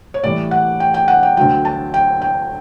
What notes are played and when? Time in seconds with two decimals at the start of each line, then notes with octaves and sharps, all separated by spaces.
0.14 C#5
0.23 A2 E3 G3 D5
0.51 F#5
0.80 G5
0.94 G5
1.08 F#5
1.23 G5
1.37 D2 D3 F#3 G5
1.65 A5
1.94 G5
2.22 G5